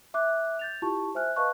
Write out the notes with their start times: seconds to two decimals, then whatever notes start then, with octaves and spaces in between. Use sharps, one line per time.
0.14 E5 D6 F#6
0.59 G6 A6 F7
0.82 E4 F4 G4 A5 C#6
1.15 C5 E5 G#5 F6 F#6
1.36 B4 D#5 F5 A5 C#6 F#6